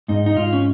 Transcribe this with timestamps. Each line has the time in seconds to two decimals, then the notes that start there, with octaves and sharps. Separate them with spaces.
0.08 G#2 D#4
0.26 D#4
0.36 G#2 F4
0.53 C#4